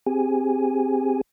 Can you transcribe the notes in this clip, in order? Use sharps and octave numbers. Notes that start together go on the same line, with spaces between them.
C4 G4 G#4 G#5